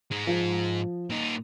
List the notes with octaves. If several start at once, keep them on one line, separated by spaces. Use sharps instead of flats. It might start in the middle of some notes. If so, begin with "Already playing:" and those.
G#2 G#3
F3
A#2 D#4